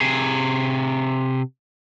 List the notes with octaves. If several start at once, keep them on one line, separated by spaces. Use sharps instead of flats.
C3 G#4